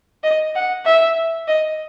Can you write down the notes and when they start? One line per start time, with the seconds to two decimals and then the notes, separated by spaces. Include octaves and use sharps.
0.24 D#5
0.55 F#5
0.86 E5
1.48 D#5